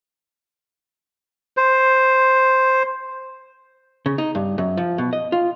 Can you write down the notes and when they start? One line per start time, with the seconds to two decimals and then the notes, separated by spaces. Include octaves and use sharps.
1.57 C5
4.06 C#3
4.18 D#4
4.35 G2
4.58 F#2
4.77 F3
4.98 B2
5.13 D#5
5.32 F4